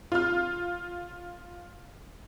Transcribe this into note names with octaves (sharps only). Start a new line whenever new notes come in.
F4 F6